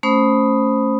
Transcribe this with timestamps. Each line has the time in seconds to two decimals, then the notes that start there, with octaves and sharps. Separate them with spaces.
0.03 A3 C#4 C5 B5 D#6